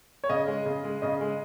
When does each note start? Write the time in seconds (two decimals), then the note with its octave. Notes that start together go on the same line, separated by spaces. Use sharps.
0.24 C#5
0.29 C#3 D#5
0.48 G#3
0.66 C#3
0.84 G#3
1.02 C#3 D#5
1.21 G#3